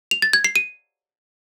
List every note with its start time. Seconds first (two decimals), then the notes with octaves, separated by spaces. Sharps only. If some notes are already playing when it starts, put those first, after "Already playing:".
0.11 F7
0.22 A6
0.33 G#6
0.44 C7
0.55 D#7